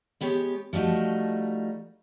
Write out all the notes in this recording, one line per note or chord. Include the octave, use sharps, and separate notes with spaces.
G#3 B3 G4 C#5
F3 G3 A3 D#4 F#4